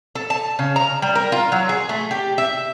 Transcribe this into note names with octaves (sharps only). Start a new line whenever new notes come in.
A4
A5
C#3
A#5
G3
A#4
F4
F#3
G#4
A3
G4
E5